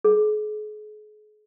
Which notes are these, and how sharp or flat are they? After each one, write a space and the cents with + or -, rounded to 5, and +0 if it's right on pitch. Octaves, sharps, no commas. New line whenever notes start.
G#4 +40